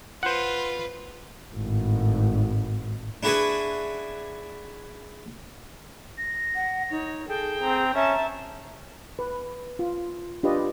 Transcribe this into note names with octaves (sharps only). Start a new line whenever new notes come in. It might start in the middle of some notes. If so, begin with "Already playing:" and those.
F4 B4 C5 F#5
G#1 A2
D4 E4 F#4 G#4 B4
A#6
F#5
D#4 C#5
G#4 A4 G5
C4 A#5
C#4 E5 A5 A#5
B4
F4
D4 F4 G4 B4 D5 D#5